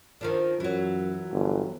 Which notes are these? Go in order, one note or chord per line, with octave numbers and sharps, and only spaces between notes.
D#3 F3 D4
F#2 E3 F#3
G1